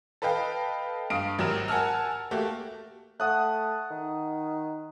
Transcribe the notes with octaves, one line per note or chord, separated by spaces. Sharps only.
A4 B4 D#5 F5 G5
G2 F5 D#6 D7
G#1 F#3 G4 A#4 F6 E7
A#4 F#5 G#5 A5 E6 F6
A3 A#3 F#4 G4
A3 F#5 D#6 F#6
D#3